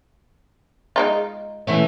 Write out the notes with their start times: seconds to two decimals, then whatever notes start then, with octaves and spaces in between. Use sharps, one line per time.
0.96 G#3 D#4 F4
1.67 E3 A3 C#4